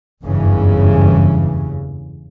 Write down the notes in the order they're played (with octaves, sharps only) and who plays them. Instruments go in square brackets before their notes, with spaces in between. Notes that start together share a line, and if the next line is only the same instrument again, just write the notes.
[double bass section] F#1 E2 G2 C#3 E3